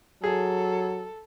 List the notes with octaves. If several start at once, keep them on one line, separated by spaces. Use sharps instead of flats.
F#3 G#4 A4